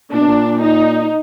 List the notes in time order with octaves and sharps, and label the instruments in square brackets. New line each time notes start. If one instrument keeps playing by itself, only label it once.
[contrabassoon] A#2 [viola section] D4
[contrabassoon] B2
A#2
[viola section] D#4